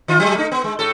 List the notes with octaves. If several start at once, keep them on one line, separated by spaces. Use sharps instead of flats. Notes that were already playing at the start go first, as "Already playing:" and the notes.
D#3 F4
F#3 G#3
A3 D#4
B3
G#3
A2 A4